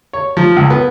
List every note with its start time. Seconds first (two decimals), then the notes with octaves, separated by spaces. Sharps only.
0.13 C#5
0.37 F3
0.56 C#2
0.70 B3